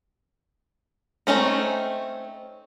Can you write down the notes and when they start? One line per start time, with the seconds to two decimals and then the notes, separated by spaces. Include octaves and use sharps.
1.27 A3 C4 C#4 D#4